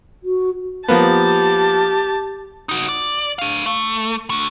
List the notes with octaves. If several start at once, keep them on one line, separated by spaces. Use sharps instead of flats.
F#4
F3 A#3 B3 G4 A5
D#4 F#4
D5
A3 F5
A3
A3 D4